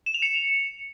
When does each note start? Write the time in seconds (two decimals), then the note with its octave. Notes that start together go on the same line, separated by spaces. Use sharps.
0.06 E7
0.14 F7
0.22 C#7